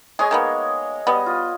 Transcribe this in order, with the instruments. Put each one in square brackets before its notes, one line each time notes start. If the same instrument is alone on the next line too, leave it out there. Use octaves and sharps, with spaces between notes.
[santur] G#3 C#5 D#5 [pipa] G#4
[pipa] D#3 A#3 B3
[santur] G3 D#5 [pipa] B3
[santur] F4